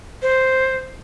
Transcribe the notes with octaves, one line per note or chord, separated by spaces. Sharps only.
C5